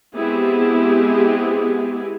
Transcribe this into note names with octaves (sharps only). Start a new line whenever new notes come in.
G#3 B3 C4 E4 G4 G#4